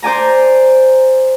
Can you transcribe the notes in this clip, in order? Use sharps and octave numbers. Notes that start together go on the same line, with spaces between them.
C5 D5 G#5 A#5